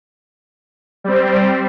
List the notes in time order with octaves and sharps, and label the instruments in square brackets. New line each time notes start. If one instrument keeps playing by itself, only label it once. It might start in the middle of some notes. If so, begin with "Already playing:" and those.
[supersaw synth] G3 C4